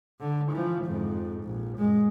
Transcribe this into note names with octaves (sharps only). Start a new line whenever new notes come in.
D3
E3 F3
F2 G#2
A#1
F#2 G#3